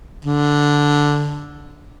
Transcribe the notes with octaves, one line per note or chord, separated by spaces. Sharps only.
D3